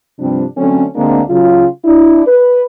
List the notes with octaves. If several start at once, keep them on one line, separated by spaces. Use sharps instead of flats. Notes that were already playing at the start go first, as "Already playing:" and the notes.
G2 C3 F3 G3 C4 D4
D3 F#3 A3 C4 C#4
D2 D3 G#3 A#3 C4 D4
C#3 F#3 F4
D4 E4
B4